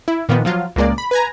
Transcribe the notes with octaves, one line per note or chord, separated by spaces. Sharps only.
E4
A#2 D#3 F3 B3
F3 F#3 F4
C#2 A#2 G#3 A#3 D5
B5
B4 G#5 A#5